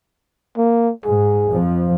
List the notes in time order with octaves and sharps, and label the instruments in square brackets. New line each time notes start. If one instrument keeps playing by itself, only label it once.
[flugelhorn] A#3
[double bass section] G#2 [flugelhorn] G#4
[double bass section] F2 F3